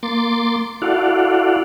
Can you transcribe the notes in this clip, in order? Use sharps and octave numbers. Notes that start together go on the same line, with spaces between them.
A#3 C6 D6 A6
E4 F#4 A4 D5 F5 F#5